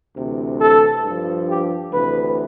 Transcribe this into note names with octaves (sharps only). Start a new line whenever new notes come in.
D2 C3 E3
A4
G2 F3
G4
D2 C3 E3 B4